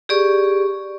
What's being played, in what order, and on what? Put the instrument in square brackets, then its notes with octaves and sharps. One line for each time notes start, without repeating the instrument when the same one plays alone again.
[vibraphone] G4 G#4 D5 C#6